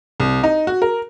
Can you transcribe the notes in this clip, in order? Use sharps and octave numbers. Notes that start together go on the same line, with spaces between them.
C2
D#4
F#4
A#4